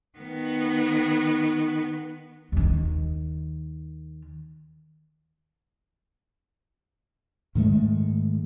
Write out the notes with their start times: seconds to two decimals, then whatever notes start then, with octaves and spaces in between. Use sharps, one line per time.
0.18 D#3 B3
2.52 D#2 D#3
7.55 G#2 D#3 G#3 A3